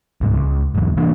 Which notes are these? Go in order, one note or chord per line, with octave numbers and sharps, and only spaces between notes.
D1 C2 G#2
C#2
B1 E2 G#2
C3 E3 A#3 D4